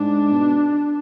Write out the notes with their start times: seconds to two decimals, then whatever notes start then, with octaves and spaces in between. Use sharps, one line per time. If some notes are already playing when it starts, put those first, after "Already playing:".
Already playing: G#2 D4
0.33 B2